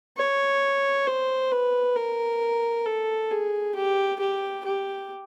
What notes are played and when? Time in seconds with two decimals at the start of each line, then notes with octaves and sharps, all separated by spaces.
0.18 C#5
1.07 C5
1.52 B4
1.96 A#4
2.86 A4
3.31 G#4
3.75 G4
4.20 G4
4.65 G4